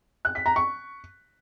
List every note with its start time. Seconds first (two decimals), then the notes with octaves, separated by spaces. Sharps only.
0.25 F#6
0.35 B6
0.46 A#5
0.56 C#6